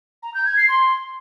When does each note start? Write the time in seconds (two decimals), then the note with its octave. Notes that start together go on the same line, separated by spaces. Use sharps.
0.23 A#5
0.34 G6
0.46 G#6
0.57 C7
0.69 C6